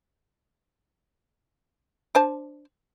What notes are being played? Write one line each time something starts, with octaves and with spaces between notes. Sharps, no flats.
D4 C5 A5